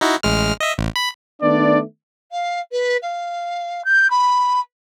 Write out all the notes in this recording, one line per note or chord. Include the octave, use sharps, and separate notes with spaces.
D#4 E4 F#4
A1 G#3 F6
D#5 E5
A1
B5
D#3 A3 B3 D4 D5
F5
B4
F5
G6
B5